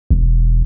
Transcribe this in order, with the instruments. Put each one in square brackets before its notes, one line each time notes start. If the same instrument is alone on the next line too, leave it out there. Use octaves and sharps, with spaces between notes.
[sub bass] E1